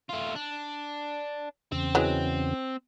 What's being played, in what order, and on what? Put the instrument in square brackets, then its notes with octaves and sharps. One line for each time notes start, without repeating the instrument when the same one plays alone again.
[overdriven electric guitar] A3 F4
D4
[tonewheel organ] E2 C#3 [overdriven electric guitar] C4
[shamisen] E3 F#3 G#3